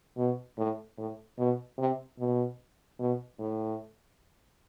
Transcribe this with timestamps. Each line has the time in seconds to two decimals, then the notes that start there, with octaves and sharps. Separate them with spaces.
0.17 B2
0.58 A2
0.98 A2
1.38 B2
1.78 C3
2.19 B2
3.00 B2
3.39 A2